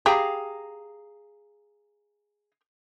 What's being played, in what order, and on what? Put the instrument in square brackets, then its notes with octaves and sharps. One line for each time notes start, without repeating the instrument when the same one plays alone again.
[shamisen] G4 G5 [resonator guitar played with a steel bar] G#4 F5 A#5